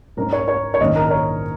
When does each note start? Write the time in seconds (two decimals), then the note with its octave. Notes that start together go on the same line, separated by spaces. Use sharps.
0.17 G#2 G#3 C#4 A#4
0.33 C#5
0.48 C#5
0.74 C#5
0.80 A#1 G#2 D#3 C#4 D#5
0.96 A#4
1.06 A#4
1.11 C#5